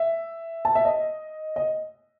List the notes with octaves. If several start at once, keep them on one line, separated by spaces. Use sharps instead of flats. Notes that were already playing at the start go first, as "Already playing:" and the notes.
Already playing: E5
A5
E5
D#5
D#5